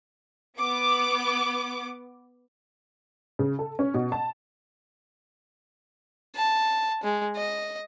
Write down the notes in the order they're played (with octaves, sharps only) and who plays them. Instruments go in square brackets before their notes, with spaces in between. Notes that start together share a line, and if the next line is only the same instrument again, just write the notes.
[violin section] B3 D6
[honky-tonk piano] C#3
A4
C#4
B2
A5
[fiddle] A5
G#3
D#5